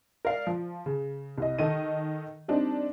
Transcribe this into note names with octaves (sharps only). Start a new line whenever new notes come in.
A#4 D5 F5
F3
C#3
C2 D#5
D#3 A4 D#5 D#7
G3 C4 D4 D#4